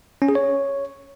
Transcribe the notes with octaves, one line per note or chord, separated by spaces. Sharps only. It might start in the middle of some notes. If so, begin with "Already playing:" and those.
C#4
G#4
C#5